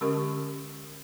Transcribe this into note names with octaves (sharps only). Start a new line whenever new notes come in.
D3 G#3 C#4 G4 A#4 C#6